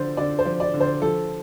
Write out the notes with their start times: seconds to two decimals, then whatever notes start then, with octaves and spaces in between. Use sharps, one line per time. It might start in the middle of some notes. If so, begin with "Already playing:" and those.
Already playing: D3 F3 C5 D5
0.17 D3 D5
0.39 C5
0.45 F3
0.60 D5
0.74 D3
0.81 C5
1.01 F3 A4